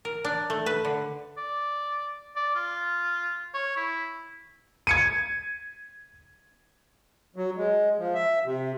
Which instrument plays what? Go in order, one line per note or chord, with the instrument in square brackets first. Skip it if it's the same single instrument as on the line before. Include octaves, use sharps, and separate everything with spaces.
[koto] A#4
D4
A3
B4
D3
[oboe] D5
D5
F4
C#5
E4
[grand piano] G#6 C#7 D#7
[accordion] F#3
G#3
F3
E5
C3